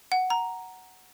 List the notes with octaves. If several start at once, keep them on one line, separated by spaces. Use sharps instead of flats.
F#5
A#5